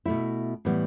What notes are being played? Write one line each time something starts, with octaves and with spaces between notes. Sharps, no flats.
B2 A3 E4
A2 E3 G3 B3